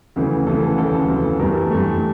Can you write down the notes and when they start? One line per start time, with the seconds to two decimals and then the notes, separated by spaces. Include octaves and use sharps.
0.16 D2 C#3 E3
0.46 D2 C#3 E3 A4
0.62 A4
0.78 D2 C#3 E3 A4
1.08 D2 C#3 E3
1.39 G2 E3 A3 A#4
1.71 G2 E3 A3